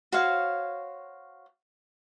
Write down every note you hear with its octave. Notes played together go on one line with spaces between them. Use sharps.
F#4 C5 C#5 F5